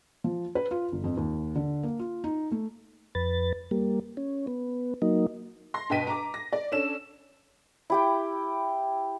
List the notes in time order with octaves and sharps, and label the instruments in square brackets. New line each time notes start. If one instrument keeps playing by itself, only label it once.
[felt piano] F3
B4
F4
G1
F2
D#2
D3
A#3
F4
D#4
A3
[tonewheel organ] F2 B4 A6
G3 A#3
C#4
B3
F#3 A#3 D#4
[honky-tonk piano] C6 A#6
G2 B2 D#5 G5 B6 D#7
A#5 D6
A#6
D5
C#4 D4 A4 E7
[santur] E4 G4 G5